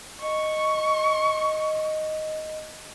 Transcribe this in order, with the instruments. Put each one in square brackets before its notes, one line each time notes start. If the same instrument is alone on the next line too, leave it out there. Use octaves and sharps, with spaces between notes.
[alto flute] D#5 [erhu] C#6